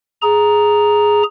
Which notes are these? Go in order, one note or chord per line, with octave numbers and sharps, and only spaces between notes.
G#4 A#5